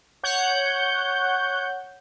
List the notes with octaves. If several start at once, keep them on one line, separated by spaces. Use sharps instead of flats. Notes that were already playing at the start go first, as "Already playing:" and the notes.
C#5 F#5 G6